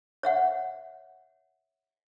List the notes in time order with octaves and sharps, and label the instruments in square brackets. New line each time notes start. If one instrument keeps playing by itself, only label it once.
[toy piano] C#5 E5 F#5